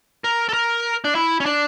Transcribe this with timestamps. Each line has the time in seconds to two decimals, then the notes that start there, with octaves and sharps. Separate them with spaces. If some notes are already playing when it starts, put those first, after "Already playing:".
0.24 A#4
0.49 A4
0.53 A#4
1.04 D4
1.15 E4
1.40 C#4
1.46 D4